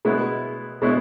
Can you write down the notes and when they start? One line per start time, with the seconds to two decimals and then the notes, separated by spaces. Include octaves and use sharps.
0.05 B2 G#3 B3 E4
0.82 B2 G#3 B3 E4